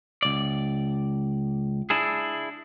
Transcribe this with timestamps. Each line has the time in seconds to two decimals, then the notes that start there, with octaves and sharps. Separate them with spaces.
0.23 C#2 D5
1.90 D4 E4 G#4